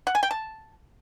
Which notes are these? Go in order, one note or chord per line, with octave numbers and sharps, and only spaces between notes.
F#5
G#5
G5
A5